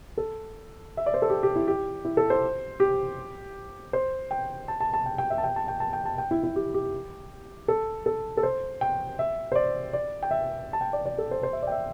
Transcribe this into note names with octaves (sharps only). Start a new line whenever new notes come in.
A4
E5
D5
C5
A4
G4
G4
E4
G4
E4
A4
C5
G4
C5
G5
A5
A5
A5
G5
G5
E5
A5
G5
A5
G5
A5
G5
A5
G5
E4
E4
G4
G4
A4
A4
A4
C5
G5
E5
C5
D5
D5
G5
E5
A5
G5
D5
D5
A4
C5
C5
E5
D5
G5
E5